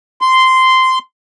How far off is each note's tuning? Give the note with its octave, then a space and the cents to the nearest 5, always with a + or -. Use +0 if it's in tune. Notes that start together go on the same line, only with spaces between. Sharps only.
C6 -10